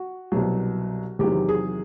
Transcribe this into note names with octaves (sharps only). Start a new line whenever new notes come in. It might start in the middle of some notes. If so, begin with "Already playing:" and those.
Already playing: F#4
C2 B2 F#3
E2 C3 D#3 F#3 G4
G#4